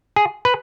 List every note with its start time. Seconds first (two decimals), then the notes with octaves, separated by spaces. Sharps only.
0.16 G#4
0.45 B4